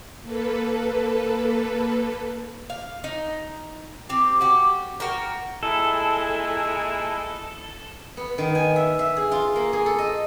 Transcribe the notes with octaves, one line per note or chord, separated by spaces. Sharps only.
A#3 A4 B4
F5
D#4
C4 G4
F#4 G4
F#4 A#4 G5
A#2 G#3 E4 A4
B3
D#3
G#5
E5
E5
G#4
F4
A#3
G#4
A4
D#5